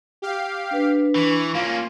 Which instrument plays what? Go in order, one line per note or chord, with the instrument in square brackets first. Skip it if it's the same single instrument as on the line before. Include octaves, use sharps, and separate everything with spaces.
[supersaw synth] G4 F5
[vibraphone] D4 B4
[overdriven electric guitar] E3 [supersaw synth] C#6
[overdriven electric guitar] A#3 C#4 [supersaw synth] F4 [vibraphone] F5